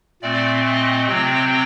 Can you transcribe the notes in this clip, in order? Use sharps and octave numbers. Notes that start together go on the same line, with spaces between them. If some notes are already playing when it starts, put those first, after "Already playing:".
A#2 A3 C4 D5
D#5
C3 F#3 C4 G5